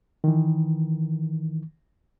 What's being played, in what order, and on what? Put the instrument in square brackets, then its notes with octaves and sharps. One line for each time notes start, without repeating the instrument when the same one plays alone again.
[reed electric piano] D#3 E3